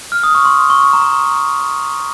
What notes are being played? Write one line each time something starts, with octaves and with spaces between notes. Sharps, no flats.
F6
D#6
C#6
C6
C#6
A#5